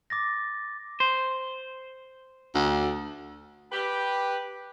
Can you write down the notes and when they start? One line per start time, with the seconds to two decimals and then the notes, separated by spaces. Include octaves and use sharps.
0.10 D6 A6 A#6
1.00 C5
2.55 D2
3.72 G4 B4